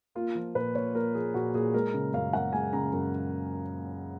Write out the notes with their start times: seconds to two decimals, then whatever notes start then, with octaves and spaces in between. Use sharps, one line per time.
0.15 A#3 F4
0.35 F3
0.55 A#2 B4
0.75 A#2 C#5
0.95 A#3 A#4
1.14 F3 G#4
1.34 A#2 F#4
1.54 A#2 G#4
1.74 G#3 A#4
1.94 C#3
2.14 F#2 F5
2.33 F#2 F#5
2.53 G#3 G#5
2.73 C#3 A#5
2.93 F#2